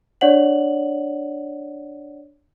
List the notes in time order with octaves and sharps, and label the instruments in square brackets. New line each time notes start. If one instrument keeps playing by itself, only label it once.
[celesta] D4 C#5 D5 F#5 F#7